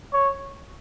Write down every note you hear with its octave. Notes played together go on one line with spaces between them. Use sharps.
C#5